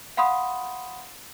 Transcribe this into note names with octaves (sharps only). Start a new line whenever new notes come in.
F5 F#5 B5 C6 D#6